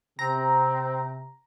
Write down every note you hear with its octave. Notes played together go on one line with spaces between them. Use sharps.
C3 C4 A#5